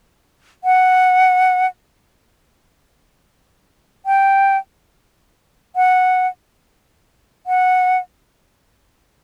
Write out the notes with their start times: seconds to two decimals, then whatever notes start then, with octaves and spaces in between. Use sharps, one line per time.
0.64 F#5
4.06 G5
5.76 F#5
7.47 F#5